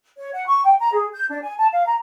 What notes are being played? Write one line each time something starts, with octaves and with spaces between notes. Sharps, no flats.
C#5
F#5
C#6
G5
A#5
G#4
G6
D4
G#5
A5
F5
A#5